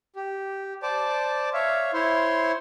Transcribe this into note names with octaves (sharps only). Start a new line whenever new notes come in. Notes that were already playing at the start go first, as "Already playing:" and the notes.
G4
C5 D5 A5 D6
C#5 E5 F5
E4 C5 C#5 C6